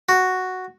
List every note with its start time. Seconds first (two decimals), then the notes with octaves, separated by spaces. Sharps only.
0.09 F#4